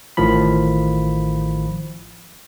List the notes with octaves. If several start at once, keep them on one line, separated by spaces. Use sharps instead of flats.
A1 A2 D#3 F3 B5